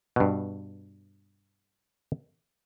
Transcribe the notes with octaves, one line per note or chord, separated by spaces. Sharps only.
G2 B2